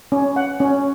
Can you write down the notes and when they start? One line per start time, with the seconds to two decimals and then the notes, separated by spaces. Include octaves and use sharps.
0.12 C#4
0.36 F#5
0.60 C#4